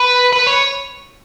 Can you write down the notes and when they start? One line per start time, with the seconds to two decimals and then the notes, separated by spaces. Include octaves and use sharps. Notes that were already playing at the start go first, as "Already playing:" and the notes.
Already playing: B4
0.33 B4
0.47 C#5